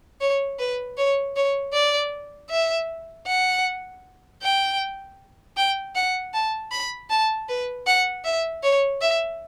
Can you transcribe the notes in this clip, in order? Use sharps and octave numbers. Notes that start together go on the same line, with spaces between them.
C#5
B4
C#5
C#5
D5
E5
F#5
G5
G5
F#5
A5
B5
A5
B4
F#5
E5
C#5
E5